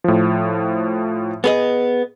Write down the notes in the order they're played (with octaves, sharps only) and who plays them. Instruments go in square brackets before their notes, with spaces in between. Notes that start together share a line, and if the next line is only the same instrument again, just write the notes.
[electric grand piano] A2 F3
[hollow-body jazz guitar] B3 G#4 D#5